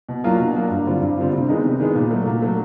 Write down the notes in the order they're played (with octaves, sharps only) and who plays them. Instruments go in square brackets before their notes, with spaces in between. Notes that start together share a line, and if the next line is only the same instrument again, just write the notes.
[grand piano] B2
F#3 A#3 D4 F4
B2
F#3 A#3 D4 F4
G2
D3 G3 C4 F4
G2
D3 G3 C4 F4
C3
D#3 G#3 B3 D#4
C3
D#3 G#3 B3 D#4
A#2
F#3 A3
A#2
F#3 A3